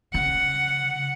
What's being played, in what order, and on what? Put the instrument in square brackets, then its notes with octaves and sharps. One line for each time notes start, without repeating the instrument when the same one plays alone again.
[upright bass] C#3 [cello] F#5